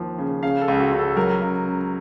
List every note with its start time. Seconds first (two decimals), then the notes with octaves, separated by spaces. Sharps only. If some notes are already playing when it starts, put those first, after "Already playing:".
Already playing: D#2 F3
0.18 C#3
0.43 C#3 F5
0.61 A4
0.68 C#2
0.80 F#4
0.92 C#2
0.99 A4
1.17 F#3 A#4
1.41 C#2
1.66 C#3